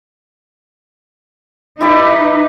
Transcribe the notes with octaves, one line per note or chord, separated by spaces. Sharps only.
D#4 E4 G4 B4 D5